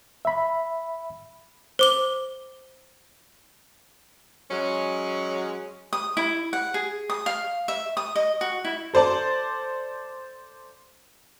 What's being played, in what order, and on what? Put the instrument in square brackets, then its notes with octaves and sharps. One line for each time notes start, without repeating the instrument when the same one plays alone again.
[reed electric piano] E5 B5
[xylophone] C5 D6 G7
[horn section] F#3 G#3 C#4
[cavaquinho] D#6
E4
F#5
G#4
D#6
F5
E5
D#6
D#5
F#4
E4
[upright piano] A4 C5 D5 A5